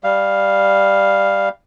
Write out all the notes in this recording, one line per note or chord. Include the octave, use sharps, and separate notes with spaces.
G3 F5